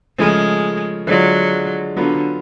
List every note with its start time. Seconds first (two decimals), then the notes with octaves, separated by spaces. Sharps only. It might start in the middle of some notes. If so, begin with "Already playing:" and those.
0.18 C#3 F3 G#3 A3
1.07 D3 F#3 G#3 D4 F4
1.97 D3 F#3 B3 F4